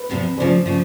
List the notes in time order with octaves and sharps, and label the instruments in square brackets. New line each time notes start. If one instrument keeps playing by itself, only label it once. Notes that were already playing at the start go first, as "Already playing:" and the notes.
Already playing: [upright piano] B4
[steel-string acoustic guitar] E2 C3 F3
[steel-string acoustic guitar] D2 C#3 F3 [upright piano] C5 D5
[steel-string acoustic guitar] C#3 F3